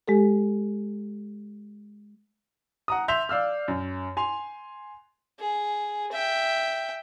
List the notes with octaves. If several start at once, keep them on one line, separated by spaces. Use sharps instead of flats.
G#3 G4 A4
F#5 A#5 D#6
E5 C6 G6 F7
D5 F5 E6 F6
F#2
G#5 C6 F7
G#4
E5 G5